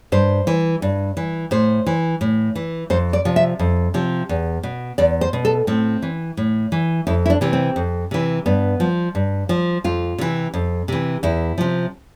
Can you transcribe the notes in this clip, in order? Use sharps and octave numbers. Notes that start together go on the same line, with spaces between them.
G2 C5
E3
G2
E3
A2 C5
E3
A2
E3
F2 C5
D5
C3 F3
E5
F2
C3 F3
E2
B2
E2 D5
C5
B2
A4
A2 C4
E3
A2
E3
F2 E4
E4
D4
C3 E3
C4
F2
C3 E3
G2 B3
F3
G2
F3
F2 F4
C3 E3
F2
C3 E3
E2 E4
C3 F3